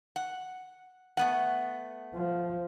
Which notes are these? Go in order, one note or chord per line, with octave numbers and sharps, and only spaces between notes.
F#5
A3 B3 F#5
F3